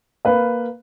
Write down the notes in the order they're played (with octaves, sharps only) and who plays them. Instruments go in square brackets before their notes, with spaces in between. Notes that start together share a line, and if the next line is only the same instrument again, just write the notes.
[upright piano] A#3 B4 F5